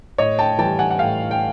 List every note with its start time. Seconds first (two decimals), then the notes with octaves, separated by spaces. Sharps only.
0.18 A2 C#5 D#5
0.39 G5 A5
0.59 E3 G3 G5 A5
0.79 F#5 G#5
0.91 F#5
0.99 A2 F5 G5
1.31 G5